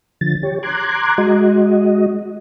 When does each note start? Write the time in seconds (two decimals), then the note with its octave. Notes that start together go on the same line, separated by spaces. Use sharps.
0.21 D3 F3 A6
0.43 G4 C#5
0.63 A#5 C6 D6 F#6 G#6
1.18 G#3 F#4 D#5